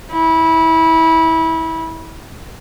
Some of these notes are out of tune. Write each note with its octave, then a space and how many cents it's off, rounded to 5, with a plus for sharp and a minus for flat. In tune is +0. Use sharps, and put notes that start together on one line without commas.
E4 -25